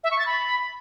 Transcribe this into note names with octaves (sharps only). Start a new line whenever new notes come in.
E5
C#6
A6
B5